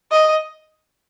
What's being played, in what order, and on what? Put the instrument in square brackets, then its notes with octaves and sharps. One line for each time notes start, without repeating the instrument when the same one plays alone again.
[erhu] D#5